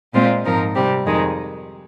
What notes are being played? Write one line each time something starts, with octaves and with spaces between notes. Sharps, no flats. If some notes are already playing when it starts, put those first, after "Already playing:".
A#2 G#3 C4 F4 C5
G#2 F3 C4 D#4 A#4
C3 G3 C4 G4
F2 D#3 G#3 D#4